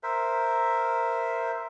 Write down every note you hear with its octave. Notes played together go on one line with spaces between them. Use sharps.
A#4 C5 E5